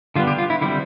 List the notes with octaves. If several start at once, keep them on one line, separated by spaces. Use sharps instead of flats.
D3 G3 B3 F4
G4
F4
E4
D3 G3 C4 E4